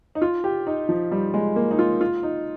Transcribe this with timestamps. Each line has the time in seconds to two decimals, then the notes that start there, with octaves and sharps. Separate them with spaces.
0.15 D#4
0.22 F4
0.44 G4
0.67 D#4
0.89 F3
1.11 G3
1.34 G#3
1.56 A#3
1.71 D#4
1.79 F4
2.01 F4
2.23 D#4